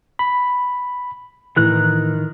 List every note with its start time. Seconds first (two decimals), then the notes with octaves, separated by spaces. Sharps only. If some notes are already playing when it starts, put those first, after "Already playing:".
0.19 B5
1.56 A2 D#3 E3 A#4 F#6